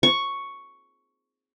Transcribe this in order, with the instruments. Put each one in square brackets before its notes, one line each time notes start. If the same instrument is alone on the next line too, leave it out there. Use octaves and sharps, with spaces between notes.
[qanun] C#6